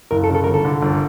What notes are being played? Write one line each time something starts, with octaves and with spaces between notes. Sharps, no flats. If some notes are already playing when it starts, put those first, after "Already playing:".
F#1 A#4
A4
C#3
A4
G1 A#4
A4
D3
G1